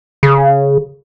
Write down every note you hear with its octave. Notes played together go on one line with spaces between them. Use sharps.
C#3